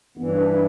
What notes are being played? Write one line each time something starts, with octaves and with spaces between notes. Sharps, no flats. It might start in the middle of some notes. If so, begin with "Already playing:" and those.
G2 E3 B3
C#4
D4
E4